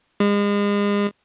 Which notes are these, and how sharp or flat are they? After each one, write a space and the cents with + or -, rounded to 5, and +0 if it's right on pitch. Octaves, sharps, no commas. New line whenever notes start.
G#3 -35